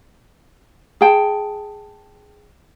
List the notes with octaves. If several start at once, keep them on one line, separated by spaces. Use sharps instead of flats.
G#4 G5 A5